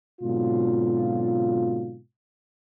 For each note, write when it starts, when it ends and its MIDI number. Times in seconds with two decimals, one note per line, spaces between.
0.22 1.97 44
0.22 1.97 47
0.22 1.97 50
0.22 1.97 54
0.22 1.97 60
0.22 1.97 65